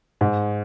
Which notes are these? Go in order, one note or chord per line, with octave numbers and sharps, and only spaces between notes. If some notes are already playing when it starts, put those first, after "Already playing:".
G#2